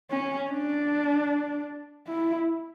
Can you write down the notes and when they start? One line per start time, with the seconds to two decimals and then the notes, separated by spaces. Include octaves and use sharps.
0.10 C#4
0.50 D4
2.08 E4